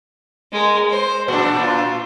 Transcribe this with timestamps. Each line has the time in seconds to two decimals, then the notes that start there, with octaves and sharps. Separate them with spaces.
0.52 G#3 A#4
0.90 C5
1.28 A#2 D4 F#4
1.59 F4